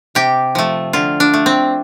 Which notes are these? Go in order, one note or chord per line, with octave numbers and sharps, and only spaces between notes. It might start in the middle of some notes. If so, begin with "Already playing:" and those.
C3 G4
F3 A3
D3 F4
D4
A3
C4